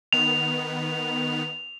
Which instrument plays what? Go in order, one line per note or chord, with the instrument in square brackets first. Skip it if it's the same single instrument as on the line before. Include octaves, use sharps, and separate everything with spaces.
[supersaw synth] D#3 B3 [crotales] F7